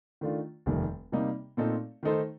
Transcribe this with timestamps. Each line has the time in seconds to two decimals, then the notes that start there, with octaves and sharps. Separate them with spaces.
0.21 D#3 A3 D4 F4
0.66 F1 D#2 D#3 G3
1.12 C3 G3 A#3 D#4
1.57 A#2 A3 C4 D#4 A4
2.03 D#3 A3 D#4 A4 C5